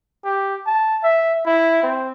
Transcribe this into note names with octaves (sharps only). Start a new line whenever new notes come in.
G4
A5
E5
E4
C4